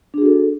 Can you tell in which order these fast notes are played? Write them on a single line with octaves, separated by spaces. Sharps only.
D4 G#4 F#4 A4